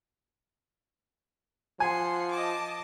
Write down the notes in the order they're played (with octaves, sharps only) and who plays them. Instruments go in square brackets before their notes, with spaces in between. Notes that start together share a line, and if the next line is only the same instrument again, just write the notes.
[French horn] F3 [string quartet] F#5 C6 [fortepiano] G#5
[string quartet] D#5 A5 D6